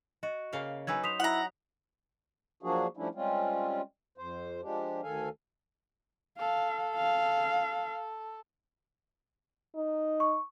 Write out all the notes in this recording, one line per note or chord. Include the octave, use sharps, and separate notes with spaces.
F#4 D#5
C#3 A#3 F5
F#3 D#4 B4 G#5 E6 G#6
C5 D#6 B6 F7
E4 F#5 A#5
F3 F#3 A#3 D4 F#4 G#4
F3 G3 A3 C#4 D4 E4
G3 G#3 C4 C#4 F4
F2 C5
F3 G#3 D4 G4
D2 D#3 A4 F5 G#5
A4 F5
F5
D#4
C#6